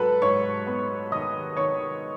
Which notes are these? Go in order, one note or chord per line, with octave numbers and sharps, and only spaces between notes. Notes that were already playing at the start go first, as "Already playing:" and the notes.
Already playing: G#2 F#3 A4 B4 A5 B5
G#2 C#5 C#6
B3
D#3 D#5 D#6
D#3 C#5 C#6